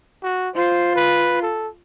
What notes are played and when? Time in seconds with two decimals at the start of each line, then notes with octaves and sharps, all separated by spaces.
0.23 F#4
0.56 F4 C5
0.96 B4
1.42 A4